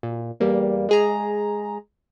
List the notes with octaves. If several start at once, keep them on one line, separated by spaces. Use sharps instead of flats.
A#2
E2 G3 A#3
G#3 G#4 A#5